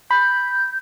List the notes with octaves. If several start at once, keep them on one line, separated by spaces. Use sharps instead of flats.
B5 G6